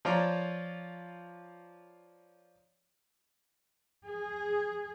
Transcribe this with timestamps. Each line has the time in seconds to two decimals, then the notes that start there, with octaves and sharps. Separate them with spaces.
0.05 F3 F4 C#5 D5 A#5 D6
4.04 G#4